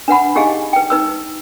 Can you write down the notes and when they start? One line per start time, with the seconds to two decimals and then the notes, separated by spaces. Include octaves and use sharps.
0.08 D4 B4 F#5 B5
0.35 D#4 G4 G#4 D#5 F5 G#5
0.73 B4 G5
0.90 D#4 B4 E6